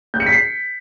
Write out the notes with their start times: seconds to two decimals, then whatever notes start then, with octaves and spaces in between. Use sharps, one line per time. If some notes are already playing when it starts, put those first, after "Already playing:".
0.14 G6
0.20 C#7
0.26 B6
0.33 C7